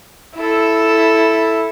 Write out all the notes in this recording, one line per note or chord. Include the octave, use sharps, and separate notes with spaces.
E4 A4